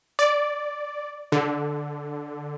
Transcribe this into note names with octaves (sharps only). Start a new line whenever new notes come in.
D5
D3